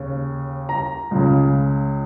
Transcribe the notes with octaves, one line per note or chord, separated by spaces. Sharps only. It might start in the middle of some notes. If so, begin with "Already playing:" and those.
Already playing: D#2 C#3
A#5
C#2 C#3